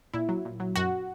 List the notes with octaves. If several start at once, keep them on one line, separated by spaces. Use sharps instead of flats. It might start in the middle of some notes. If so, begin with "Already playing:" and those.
A#2 E4
F#3
A#2
F#3
F#2 F#4